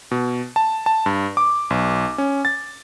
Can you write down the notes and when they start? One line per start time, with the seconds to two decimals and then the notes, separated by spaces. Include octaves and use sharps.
0.11 B2
0.56 A5
0.86 A5
1.06 G2
1.37 D6
1.70 B1
2.18 C#4
2.45 A6